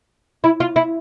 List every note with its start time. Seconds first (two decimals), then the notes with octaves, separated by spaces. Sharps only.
0.44 E4
0.60 F4
0.76 E4